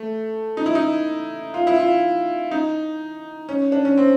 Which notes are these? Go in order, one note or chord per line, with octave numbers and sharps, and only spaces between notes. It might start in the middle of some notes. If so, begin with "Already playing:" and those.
Already playing: A3
D#4
E4
D#4
F4
E4
F4
D#4
C#4
D4
C#4
C4